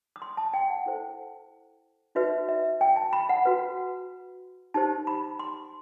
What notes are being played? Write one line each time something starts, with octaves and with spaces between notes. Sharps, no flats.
D#6
C6
A5
G5
F#5
E4 A4 C5
D#4 F#4 B4 E5
E5
G5
A5
B5
F#5
F#4 B4
D#4 G4 C5 A5
B5
C6